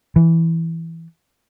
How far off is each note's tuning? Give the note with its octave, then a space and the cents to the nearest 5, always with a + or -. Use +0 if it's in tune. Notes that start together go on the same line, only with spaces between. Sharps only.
E3 +0